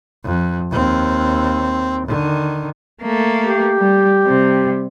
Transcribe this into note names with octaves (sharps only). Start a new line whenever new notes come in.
F2
D#2 C4
D3 D#3
A3 A#3
G4
G3
C3 G3